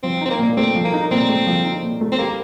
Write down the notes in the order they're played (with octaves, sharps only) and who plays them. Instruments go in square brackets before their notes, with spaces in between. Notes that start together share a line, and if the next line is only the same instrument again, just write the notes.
[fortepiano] F3 [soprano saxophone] C4
[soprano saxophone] C4 [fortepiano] D#4
[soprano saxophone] A#3
[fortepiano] A#2
[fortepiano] A3 [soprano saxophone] C4
[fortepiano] F3
[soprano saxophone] A#3
[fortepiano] D#4
[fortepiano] A#2 [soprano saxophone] C4
[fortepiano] A3
F3
D#4
A#2
A3
[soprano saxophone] C4
[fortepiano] G3 [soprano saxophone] A#3